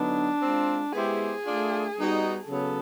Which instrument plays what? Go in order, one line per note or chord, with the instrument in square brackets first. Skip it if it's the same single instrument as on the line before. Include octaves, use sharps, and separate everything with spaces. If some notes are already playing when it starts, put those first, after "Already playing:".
Already playing: [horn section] D3 F#3 B3 D#4 [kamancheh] D4
[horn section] G#3 C4 F4
[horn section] G#3 B3 E4 G4 C5 [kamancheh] G#4
[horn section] A3 D4 F4
G3 B3 D#4 F#4
[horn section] C#3 F#3 B3 [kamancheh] A4